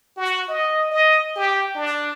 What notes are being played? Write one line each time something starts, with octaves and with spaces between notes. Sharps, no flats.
F#4
D#5
D#5
G4
D4